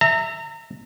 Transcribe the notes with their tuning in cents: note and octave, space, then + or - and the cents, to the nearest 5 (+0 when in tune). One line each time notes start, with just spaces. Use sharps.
E5 +0 A#5 -35